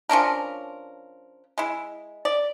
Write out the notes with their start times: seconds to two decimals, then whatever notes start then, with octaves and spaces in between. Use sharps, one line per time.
0.09 F3 C#4 D4 A#4
1.58 G#3 E4
2.25 D5